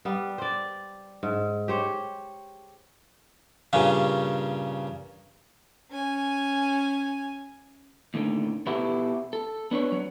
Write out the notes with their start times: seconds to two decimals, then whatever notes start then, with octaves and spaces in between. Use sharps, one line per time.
0.05 G3 B3
0.38 C5 D5
1.23 G#2
1.68 G4 C5 C#5
3.73 G2 A#2 C#3 C#4
5.91 C#4 G#5
8.14 D#2 A2 D3 D#3
8.66 B2 B3 E4 F#4 G4 A4
9.33 A4
9.71 B3 D4 B4 C#5
9.92 F#3